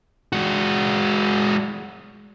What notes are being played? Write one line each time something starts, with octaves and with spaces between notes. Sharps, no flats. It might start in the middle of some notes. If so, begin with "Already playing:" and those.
G#3 F#4